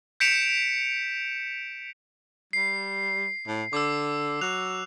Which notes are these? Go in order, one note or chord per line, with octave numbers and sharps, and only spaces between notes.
G6 B6 C#7 D7 E7 F7
G3 C7
A2
D3 D6 E6
F#3 F#6 F7